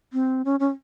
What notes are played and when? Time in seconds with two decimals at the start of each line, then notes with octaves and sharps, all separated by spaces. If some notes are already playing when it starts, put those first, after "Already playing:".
0.13 C4
0.45 C#4
0.60 C#4